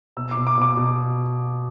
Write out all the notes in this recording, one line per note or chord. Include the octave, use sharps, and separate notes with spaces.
B2 E6
D6
B2
D6
B2 D6
B2